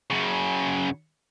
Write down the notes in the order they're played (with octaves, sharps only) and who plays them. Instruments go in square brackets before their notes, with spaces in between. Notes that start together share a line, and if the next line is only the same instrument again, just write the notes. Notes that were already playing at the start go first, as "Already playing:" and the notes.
[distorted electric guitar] F#2 C#3